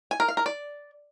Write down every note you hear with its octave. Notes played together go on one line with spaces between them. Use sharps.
G#5
A#4
F5
A#4
D5